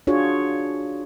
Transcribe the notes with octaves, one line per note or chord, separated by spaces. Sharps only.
D4 F4 F#4 G#4 C#5